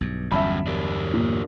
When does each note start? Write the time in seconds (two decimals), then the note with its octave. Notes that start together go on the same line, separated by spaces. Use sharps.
0.01 B1 G2
0.32 G1 E2 F#3 G3 C#4 E5 A5 B5
0.67 D4 G4 A#4
1.14 A#2